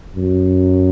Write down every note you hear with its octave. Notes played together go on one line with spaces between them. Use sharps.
F#2